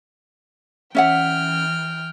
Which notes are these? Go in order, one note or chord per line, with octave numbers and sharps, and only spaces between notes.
E3 C#4 E5 F#5 G5 F6